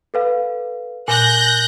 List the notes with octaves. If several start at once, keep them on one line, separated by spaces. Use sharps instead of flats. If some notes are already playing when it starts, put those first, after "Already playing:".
A4 B4 F5
A#2 G#5 F#6 G6 A#6